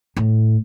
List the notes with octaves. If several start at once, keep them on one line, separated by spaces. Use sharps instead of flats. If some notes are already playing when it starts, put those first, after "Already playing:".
A2